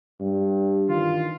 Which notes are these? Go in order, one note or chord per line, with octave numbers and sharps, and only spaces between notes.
G2
D#3 E3 F4